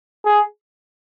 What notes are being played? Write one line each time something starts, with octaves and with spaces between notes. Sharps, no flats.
G#4